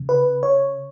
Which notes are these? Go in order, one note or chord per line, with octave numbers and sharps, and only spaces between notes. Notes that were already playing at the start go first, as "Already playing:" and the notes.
Already playing: C#3
B4
C#5